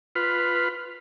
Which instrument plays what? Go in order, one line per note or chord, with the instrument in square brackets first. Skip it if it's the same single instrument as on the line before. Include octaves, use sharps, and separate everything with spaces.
[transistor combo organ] F4 B4